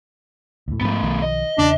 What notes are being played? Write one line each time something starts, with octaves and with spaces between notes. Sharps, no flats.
D2 A2
G#2 D#3 F3 A3 B3
B1 D#3 F3
D#5
E2 C#3 C#4 D4